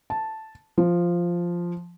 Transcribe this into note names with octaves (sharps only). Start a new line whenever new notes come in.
A5
F3